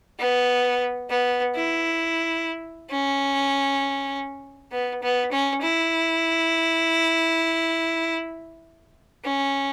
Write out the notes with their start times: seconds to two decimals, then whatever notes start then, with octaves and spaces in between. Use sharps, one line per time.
0.19 B3
1.10 B3
1.55 E4
2.91 C#4
4.72 B3
5.03 B3
5.32 C#4
5.62 E4
9.24 C#4